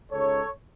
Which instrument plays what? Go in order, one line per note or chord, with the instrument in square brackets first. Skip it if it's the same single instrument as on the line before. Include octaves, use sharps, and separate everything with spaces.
[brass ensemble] C#2 C#3 G#3 D#4 A4 C#5